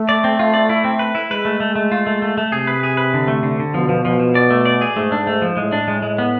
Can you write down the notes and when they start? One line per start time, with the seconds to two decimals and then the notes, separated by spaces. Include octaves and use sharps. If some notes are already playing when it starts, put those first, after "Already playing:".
Already playing: A3
0.09 D5
0.24 C4
0.39 F4
0.54 D5
0.69 E4
0.84 C4
0.99 B4
1.15 E4
1.30 G#3 B4
1.45 A3
1.60 A3
1.76 A3
1.92 F4
2.07 A3
2.22 A3
2.38 A3
2.52 C3 G#4
2.67 B4
2.83 G#4
2.97 B4
3.14 D3
3.28 A3
3.43 D3
3.59 D3
3.74 B2 F3
3.89 F3
4.05 F3
4.19 F3
4.35 D5
4.50 A3
4.65 D5
4.81 G#4
4.96 G#2 A3
5.12 D4
5.27 A3
5.42 F3
5.57 A2 G#3
5.72 D4
5.88 G#3
6.02 G#3
6.18 B3